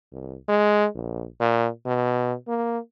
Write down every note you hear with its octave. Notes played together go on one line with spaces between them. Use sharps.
C2
G#3
A#1
A#2
B2
A#3